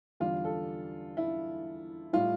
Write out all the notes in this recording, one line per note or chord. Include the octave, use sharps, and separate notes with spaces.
E2 D3 G3 F4
A4
E4
A2 G3 F4